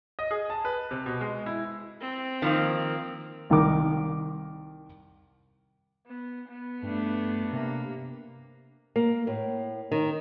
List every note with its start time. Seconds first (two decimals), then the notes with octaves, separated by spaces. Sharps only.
0.19 D#5
0.31 G#4
0.50 A5
0.65 B4
0.91 C3
1.06 B2
1.21 G#3
1.46 E4
2.01 C4
2.42 D#3 F3 A#3
3.50 C2 D#3 A#4 D6
6.06 B3
6.48 B3
6.83 G2 A3 D4
7.52 C3 A#3
8.96 A#3
9.27 A2
9.92 D#3